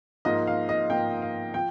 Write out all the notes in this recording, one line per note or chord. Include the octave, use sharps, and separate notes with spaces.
G#2 F3 A#3 D#5
F5
D#5
G#2 F3 A#3 G5
F5
F3 G5